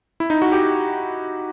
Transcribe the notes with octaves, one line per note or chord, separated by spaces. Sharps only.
E4
D#4
F#4
G4